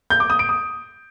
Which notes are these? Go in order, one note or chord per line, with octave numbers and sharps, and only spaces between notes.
G6
D6
D#6
D7
D#6